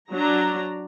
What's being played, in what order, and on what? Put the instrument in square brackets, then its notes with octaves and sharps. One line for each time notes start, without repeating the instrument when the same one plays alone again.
[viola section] F#3 D4 A#5